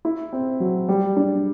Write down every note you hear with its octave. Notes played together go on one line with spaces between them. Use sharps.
E4
C4
F#3
G3
D4